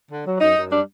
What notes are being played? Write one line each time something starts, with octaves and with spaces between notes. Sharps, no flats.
D3
F#3
F#2 D#4
F#2
G3 D4